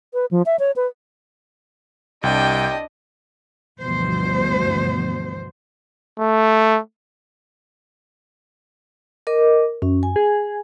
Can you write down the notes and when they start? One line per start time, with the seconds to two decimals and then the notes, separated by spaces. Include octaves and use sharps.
0.14 B4
0.31 F3
0.46 E5
0.59 C#5
0.76 B4
2.23 C2 D4 G4 D#5 G5
3.81 D2 G2 B2 E3 F3 C5
6.19 A3
9.27 A#4 D#5 D6
9.82 F#2 C#4
10.03 G#5
10.16 G#4